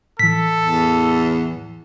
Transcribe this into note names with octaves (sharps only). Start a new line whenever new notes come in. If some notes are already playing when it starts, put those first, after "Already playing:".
A2 E3 A4 B6
E2